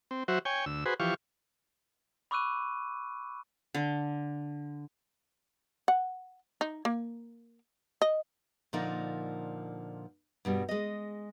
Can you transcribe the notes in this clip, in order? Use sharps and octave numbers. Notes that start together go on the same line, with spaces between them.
C4
F#3 F#4 C5 E5
C#5 G5 G#5
D2 E6
F#4 G#4 B4 C5
E3 F3 G4 F5 C#6
B5 C#6 D6 E6 F#6 D#7
D3
F#5
D#4
A#3
D#5
A#2 D3 F3 A#3 D#4
G2 B2 G3
G#3 D#5